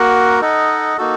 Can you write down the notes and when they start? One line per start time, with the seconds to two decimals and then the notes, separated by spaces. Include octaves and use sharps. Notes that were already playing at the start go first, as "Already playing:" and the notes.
Already playing: A#3 F#4 A#4 F#5
0.41 D#4 A4 D#5 F#5
0.98 A#3 D#4 F#4 A4